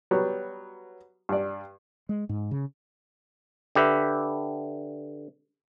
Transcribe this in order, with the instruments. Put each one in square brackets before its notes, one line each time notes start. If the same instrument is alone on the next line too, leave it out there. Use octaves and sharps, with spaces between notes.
[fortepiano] F#3 G3 B3
G2 D5
[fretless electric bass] G#3
G#2
C#3
[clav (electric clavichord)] D3 G4 B4 E5